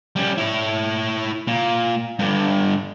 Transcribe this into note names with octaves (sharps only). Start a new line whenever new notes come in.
G3 C#4
E4 C#5
A#2
G2 D3